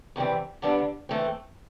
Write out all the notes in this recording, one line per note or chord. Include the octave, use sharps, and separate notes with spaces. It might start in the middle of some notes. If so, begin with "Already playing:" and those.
E2 C3 E3 G3 C4
D3 G3 B3 D4
E3 A3 C4